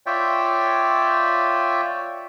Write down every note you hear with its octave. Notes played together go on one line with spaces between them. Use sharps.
F4 C#5 D5 E5 G5